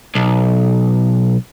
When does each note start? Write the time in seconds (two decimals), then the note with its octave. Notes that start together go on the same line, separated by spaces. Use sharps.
0.15 B1